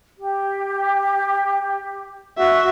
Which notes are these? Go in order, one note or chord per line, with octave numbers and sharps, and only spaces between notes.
G4
F#4 E5